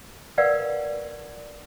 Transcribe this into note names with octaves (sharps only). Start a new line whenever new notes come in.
A#4 B4 D5 F5 F#5